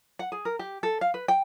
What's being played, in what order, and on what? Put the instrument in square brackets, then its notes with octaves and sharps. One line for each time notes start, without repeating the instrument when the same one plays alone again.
[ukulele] F#5
G#4
A#4
G4
A4
F5
B4
G5